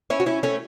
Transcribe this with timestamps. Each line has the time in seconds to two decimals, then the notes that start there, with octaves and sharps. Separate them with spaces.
0.10 C#4 E4
0.20 F#4
0.26 C#4 E4
0.43 A3 C#4